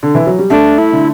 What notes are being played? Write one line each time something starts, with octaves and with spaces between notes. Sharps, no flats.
D3
E3
F#3
G3
A3 D4
E4
D3